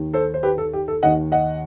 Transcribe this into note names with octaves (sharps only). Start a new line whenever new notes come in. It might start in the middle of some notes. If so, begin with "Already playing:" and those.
Already playing: D#2 D#3
A4 C5
C5
G4 B4
A4
G4
A4
D#2 D#3 D#5 F#5
D#5 F#5